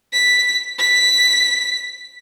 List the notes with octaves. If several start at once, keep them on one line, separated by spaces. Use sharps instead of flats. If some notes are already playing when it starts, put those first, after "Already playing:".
B6
B6